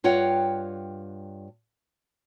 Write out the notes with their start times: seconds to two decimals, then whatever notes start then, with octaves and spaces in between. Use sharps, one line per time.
0.04 G2 F4 C#5 F#5 G5